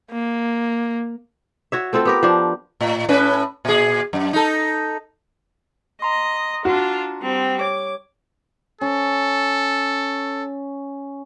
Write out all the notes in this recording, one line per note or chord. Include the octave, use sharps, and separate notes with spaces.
A#3
F#4 C#5 E5
A3 C4 F4 A4
B3 G4 A#4
F3 D4
A2
A2 C#4 B4
A#2 G#4
F#2
D#4 A4
D#5 A#5 C6
D4 F4 F#4
G3 C4
C#5 D6
C#4 A4